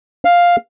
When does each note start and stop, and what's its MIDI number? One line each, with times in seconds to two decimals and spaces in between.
0.25 0.56 77